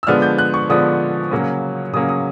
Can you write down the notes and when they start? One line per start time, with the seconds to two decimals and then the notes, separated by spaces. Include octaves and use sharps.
0.03 E6
0.07 D3 F3 G#3 B3 D4 F6
0.22 G6
0.38 F#6
0.54 C#6
0.69 D3 F3 G#3 B3 D4 D#6
1.31 C#3 F#3 A#3 C#4
1.93 C#3 F#3 A#3 C#4 D#6
2.09 D#6